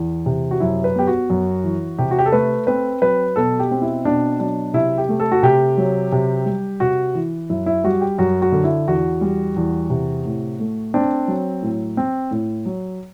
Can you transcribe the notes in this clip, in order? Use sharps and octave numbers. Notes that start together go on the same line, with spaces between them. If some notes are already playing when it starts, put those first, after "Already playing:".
Already playing: E2
C3
F#4
F#2 E4
B4
B3 G4
F#4
F#2
E3
C3 G4
F#4
G4
A4
A3 B4
C4 B4
F#3 B4
B2 A4
G4
C4
E4
B2 D4
F#3 D4
C3 E4
G4
A3
A4
F#4
C3 G4
F#3
C3
G3
C3 F#4
E3
F#2 E4
E4
G3 F#4
G4
F#2 F#4
F#4
D3
E4
E2 F#4
G3
E2
C3
A2
A3
C4 D4
F#3
A2
C4
A2
F#3